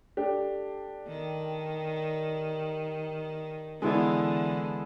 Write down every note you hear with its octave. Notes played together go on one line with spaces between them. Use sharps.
A3 D4 G4
D#3
D3 E3 G#3 B3 E4